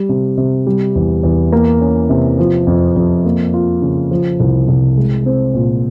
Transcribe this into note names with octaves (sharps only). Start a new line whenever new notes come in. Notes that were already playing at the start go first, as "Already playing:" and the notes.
Already playing: G3
C3
C3
G3
E2
E2
A#3
C#4
C3
F3
F2
F2
A#3
F4
C#3
F3
C2
C2
G#3
C4
A#2